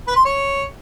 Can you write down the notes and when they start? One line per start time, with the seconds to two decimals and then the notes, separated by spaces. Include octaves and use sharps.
0.07 B4
0.16 C6
0.25 C#5